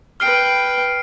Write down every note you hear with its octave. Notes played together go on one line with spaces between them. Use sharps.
B4 G5 F6 C7 D7